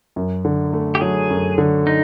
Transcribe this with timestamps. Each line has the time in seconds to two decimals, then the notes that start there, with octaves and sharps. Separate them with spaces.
0.16 F#2
0.45 D3
0.73 A3
0.95 G4
1.01 F#3 G#4
1.30 F#2
1.58 D3
1.87 D#4